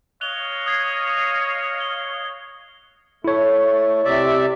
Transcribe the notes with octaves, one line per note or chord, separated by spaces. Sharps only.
C#5 D#5 F5 F#6 F7 G7
D#6 G#6 C7
G7
A3 E4 C#5
C3 D5 E5